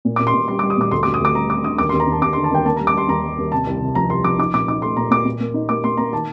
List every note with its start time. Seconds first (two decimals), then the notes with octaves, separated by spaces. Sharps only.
0.05 A#2
0.16 D6
0.19 A#2
0.27 C6
0.34 A#2
0.48 G3 C6
0.59 D6
0.63 G3
0.70 D#6
0.78 A#2 D6
0.91 D2 C6
1.03 D6
1.06 D2
1.14 D#6
1.20 D2 D6
1.35 G3 A#5
1.50 C4 D6
1.64 D3 D#6
1.78 D#2 D6
1.89 C6
1.93 D#2
2.00 A#5
2.07 D#2 A5
2.22 D#2 D6
2.33 C6
2.36 D3
2.44 A5
2.51 D#2 G5
2.65 A#3 A5
2.76 A#5
2.80 G3
2.87 D6
2.94 G3 C6
3.08 D#2 A#5
3.23 G3
3.38 D#2
3.52 C3 A5
3.66 C2
3.81 C3
3.95 F3 A#5
4.10 C2 C6
4.24 F3 D6
4.38 D#4 D6
4.53 A#2 D6
4.68 D#4 D6
4.82 A3 C6
4.97 A#2 A#5
5.11 A#2 D6
5.25 A#2
5.40 A#3
5.54 D#4
5.69 A#3 D6
5.84 A#3 C6
5.97 A#3 A#5
6.13 D#3 A5